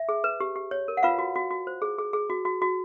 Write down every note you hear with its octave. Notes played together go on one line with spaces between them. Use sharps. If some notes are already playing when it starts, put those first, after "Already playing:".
Already playing: E5
G#4
B4
G4
G4
C#5
A#4
F#5
F4 B4 F5
F#4
F#4
F#4
C5
G#4
G#4
G#4
F#4
F#4
F#4